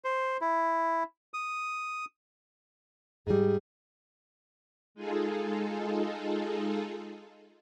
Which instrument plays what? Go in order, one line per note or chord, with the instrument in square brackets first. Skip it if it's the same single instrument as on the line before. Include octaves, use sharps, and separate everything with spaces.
[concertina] C5
E4
D#6
[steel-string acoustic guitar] G#2 G3 [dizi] G#4
[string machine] G#3 D#4 F4 G#4 A4